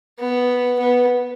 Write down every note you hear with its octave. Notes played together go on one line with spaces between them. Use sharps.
B3
B3